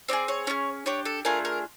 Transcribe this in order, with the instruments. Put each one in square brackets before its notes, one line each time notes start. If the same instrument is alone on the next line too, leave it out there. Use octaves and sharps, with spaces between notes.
[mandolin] C4 D#4 G#4 D5
C#5
C#4 F4 G#4
D4 G4 C#5
A4
A3 D4 F4 G#4 A#4
A#4